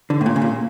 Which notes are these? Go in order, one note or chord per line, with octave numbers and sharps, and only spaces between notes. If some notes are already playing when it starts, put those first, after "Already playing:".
D3
A2
A#2
C#3
A#2